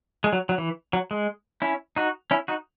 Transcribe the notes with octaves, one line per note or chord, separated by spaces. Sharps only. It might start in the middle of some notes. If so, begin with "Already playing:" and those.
G#3
F#3
F#3
E3
F#3
G#3
C#4 E4
D#4 F#4
C#4 E4
D#4 F#4